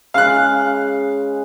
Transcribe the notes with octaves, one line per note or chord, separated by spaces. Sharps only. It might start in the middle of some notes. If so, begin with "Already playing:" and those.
C#3 G#3 F5 G#5 F#6